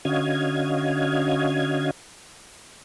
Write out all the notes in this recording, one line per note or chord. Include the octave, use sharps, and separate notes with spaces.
D3 C#4 F#4 D#5 F5 G#6